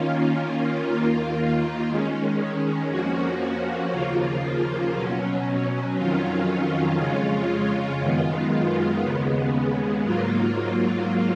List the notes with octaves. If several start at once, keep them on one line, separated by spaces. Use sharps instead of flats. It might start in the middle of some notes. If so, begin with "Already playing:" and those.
Already playing: D#3 A#3 C#4 F4
D#2 D#3 A#3 F4
D#3 G#3 C#4
F2 F3 A#3 C#4 F#4
D#2 C#3 F3 A#3 F4
B2 F#3 C#4
F2 D#3 F#3 C#4 F4
F2 C#3 G#3 C#4 F4
F#2 D#3 G#3 B3 F4
D#2 C#3 G#3 B3
G#2 F#3 A#3 F4